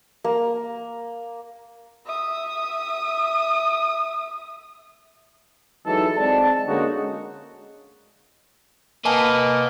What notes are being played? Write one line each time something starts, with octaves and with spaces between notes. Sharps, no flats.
A#3
E5 D#6
E3 F#3 G#3 D#4 A4
G#3 C4 D5 A5
D3 G#3 A#3 C#4 D#4 F#4
A#3 B4 D#5 G#5 A5